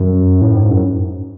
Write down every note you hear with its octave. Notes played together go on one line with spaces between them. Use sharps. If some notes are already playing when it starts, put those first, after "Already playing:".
Already playing: F#2
A2
G#2
F#2